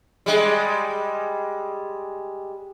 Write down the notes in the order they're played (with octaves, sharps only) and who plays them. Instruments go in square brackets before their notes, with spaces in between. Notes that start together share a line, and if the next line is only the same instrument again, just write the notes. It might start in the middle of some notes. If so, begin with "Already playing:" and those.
[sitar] G3 G#3